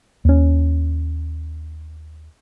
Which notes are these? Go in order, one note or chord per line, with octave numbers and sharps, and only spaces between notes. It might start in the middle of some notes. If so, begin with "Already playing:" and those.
D#2 C#4